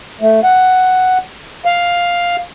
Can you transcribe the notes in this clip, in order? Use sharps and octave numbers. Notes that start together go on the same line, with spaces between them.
A3
F#5
F5